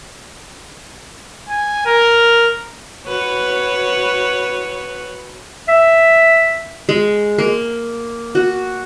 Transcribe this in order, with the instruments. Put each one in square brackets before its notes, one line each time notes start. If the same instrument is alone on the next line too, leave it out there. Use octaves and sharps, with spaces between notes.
[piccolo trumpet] G#5
A#4
[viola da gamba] F#4 B4 C#5
[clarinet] E5
[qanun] G#3
A#3
F#4